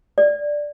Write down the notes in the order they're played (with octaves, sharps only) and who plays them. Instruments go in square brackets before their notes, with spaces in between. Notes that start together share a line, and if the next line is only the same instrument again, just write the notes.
[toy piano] D5